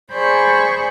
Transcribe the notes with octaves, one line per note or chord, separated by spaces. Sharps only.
G#4 C5 D5 B5 C#6 G6